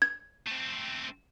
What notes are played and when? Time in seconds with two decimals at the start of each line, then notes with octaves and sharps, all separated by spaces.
0.02 G#6
0.47 A3 C4